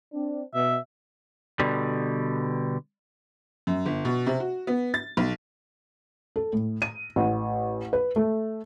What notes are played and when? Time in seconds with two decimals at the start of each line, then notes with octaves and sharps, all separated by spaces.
0.13 C4 D4
0.55 B2 E5
1.60 B2 D3 G3
3.67 F#2
3.86 G1
4.05 B2
4.27 C3
4.40 F#4
4.67 B3
4.94 A6
5.17 B1
6.36 A4
6.53 A2
6.82 D#7
7.16 A1
7.93 B4
8.16 A3